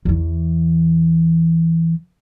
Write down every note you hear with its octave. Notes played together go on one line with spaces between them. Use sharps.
E2 E3